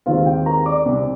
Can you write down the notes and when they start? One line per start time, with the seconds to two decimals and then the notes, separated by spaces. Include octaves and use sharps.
0.06 D#2 D#3 G#3 C4 F4 F5
0.26 G4 G5
0.46 A#4 A#5
0.66 D5 D6
0.86 C2 C3 G3